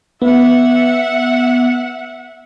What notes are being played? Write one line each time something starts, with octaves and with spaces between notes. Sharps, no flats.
B3 E5 F#5